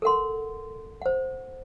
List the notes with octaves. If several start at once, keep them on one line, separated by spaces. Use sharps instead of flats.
A4 A#4 F#5 C6
C5 F#5